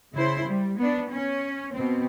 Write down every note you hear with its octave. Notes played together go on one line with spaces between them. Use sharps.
C#3 E4 C5
G3
B3 D4
C#4
B2 C4